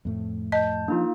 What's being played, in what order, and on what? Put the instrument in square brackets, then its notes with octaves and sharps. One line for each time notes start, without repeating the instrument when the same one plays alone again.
[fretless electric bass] F2 A2 A3
[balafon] D#5 [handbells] A5 G6
[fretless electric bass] F3 D4 [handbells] A#3 D#4 F4